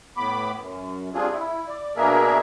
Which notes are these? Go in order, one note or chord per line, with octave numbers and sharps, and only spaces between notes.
A2 B3 B5 D6
F#2
G3 C4 D4 F4 G#4
E4
D5
B2 A#3 D4 G#4 A#4 E5